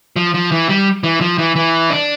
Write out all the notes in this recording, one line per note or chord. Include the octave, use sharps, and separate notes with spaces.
F3
F3
E3
G3
E3
F3
E3
E3
D4